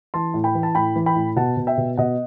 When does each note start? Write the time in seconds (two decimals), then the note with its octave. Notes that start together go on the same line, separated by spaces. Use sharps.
0.14 E3 A5 C6
0.34 A2
0.44 G5 B5
0.55 E3
0.63 A5
0.75 A2 G5 B5
0.96 E3
1.06 G5 B5
1.16 A2
1.36 B2 F#5 A5
1.57 B2
1.67 E5 G5
1.78 B2
1.97 B2 D#5 F#5